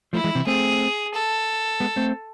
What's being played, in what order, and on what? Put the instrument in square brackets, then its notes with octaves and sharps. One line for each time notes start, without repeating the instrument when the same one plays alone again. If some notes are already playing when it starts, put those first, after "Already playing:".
[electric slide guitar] F3 A3 [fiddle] E4
[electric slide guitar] E3 G#3
C3 E3
[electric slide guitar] A3 C4 [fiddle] G#4
[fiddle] A4
[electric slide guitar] G#3 B3
A3 C4